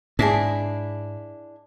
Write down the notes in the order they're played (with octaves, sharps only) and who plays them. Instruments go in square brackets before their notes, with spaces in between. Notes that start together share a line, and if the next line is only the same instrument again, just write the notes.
[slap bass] G#2 [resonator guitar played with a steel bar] D4 E4 G#4